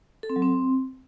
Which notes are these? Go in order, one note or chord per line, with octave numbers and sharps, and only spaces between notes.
A4
C4
F#3
C4